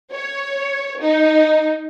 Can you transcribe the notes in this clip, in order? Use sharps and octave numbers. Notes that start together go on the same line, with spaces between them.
C#5
D#4